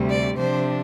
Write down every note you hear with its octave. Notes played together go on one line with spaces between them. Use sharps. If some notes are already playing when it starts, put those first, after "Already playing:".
Already playing: D2 C3 G3
D5
C3 F3 D4 C5